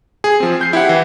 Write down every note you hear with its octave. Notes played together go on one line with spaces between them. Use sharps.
G#4
F3 C4
G6 C7
E4 G4 F#5
E3